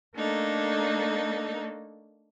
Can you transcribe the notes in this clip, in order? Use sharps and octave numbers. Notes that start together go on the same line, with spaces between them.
A3 A#3 D4 D#4 A4